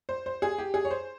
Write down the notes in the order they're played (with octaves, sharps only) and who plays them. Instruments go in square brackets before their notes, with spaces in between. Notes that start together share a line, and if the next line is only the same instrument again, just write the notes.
[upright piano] C5
C5
G#4
G4
G#4
C#5
C5